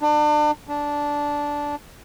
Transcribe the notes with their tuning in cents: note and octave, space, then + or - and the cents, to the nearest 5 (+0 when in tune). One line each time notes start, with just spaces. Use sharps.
D4 +35
D4 -10